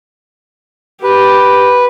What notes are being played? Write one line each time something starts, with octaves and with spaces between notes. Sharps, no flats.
G4 B4